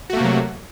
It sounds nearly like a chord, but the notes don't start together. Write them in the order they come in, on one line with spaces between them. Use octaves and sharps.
F#4 A3 A#3 C3 F#3